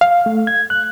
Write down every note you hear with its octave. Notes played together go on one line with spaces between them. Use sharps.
F5
A3
G#6
F#6